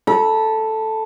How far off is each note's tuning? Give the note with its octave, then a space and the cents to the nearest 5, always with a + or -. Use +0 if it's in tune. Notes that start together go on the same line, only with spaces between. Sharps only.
A4 +0 B5 -35